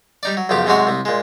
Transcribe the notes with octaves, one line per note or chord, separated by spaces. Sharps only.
G3 D#4 D5
F#3
B1 F#2 C#3 F3 G4
G#2 C3 F#3 G#3 F#4 C#5
C2 C3
A#2 G#3